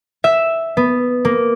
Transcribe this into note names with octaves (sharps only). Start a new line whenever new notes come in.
E5
B3
A#3